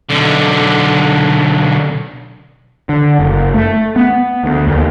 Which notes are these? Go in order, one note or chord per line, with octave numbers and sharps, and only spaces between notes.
B1 D3
D3
F#1
A3
B3
D2
D#2